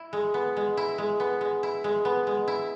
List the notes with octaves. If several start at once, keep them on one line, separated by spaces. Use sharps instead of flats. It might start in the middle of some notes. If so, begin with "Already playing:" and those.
Already playing: E4
G#3
B3
G#3
E4
G#3
B3
G#3
E4
G#3
B3
G#3
E4